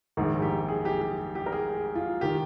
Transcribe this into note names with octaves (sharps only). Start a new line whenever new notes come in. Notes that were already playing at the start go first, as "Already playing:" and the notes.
A#1 G#2 D#3 G#4
G4
G#4
G4
G4
G4
A#4
G#4
F4
D#3 G4